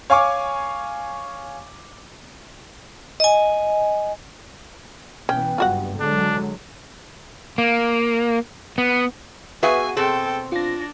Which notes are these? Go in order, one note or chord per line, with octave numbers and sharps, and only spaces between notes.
C#5 F5 G#5 C#6 D6
D#5 G#5
B2 E3 B3 C#4 G5
F#1 G2 F4 F#4 F#5
D3 F#3 G#3 D4
A#3
B3
B3 F#4 G#4 B4 E5 F5 G#5
B2 C4 G#4 A4 G5
D4 F4 A#6